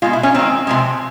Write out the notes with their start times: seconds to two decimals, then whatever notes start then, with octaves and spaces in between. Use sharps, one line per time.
0.02 B2 G#3 F4
0.13 E4
0.23 C#4
0.34 D#3 G#3 C4
0.67 C3 F3 G#3